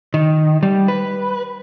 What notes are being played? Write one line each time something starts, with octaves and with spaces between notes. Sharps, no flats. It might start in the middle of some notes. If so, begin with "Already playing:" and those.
D#3
G3
B4